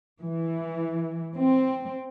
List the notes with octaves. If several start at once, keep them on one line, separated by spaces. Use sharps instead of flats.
E3
C4